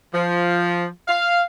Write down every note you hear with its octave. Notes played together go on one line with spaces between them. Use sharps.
F3
F5